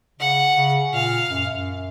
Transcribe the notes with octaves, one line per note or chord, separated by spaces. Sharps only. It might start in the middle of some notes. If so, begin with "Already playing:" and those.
C#3 F#5
C#3
A#2 F5
F#2
F#2